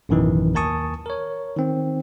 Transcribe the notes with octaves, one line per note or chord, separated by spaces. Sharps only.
A1 F#2 B2 D#3 E3 D#4
D#2 A#4 G#5 A5 C#6 D#6
A#4 C#5
D#3 C4